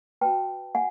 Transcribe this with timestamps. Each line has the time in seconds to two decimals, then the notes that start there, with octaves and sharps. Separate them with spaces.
0.21 F#4 B4 G5 A5
0.75 F#5 G#5